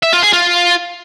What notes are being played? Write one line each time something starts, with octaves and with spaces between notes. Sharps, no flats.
E5
F4
G#4
F4